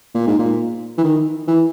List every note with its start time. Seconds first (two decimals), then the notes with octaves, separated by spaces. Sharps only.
0.15 A#2
0.27 G#2
0.39 A#2
0.98 E3
1.04 D#3
1.48 E3